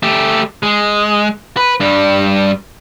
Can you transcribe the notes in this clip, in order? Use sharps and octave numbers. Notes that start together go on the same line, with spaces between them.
A3 G4
G#3
B4
G2 G3